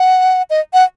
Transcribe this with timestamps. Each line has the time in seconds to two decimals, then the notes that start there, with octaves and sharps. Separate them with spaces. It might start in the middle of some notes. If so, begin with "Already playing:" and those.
Already playing: F#5
0.50 D#5
0.73 F#5